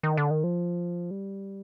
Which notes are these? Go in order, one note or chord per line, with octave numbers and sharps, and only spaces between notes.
D#3
D3
D#3
F3
G3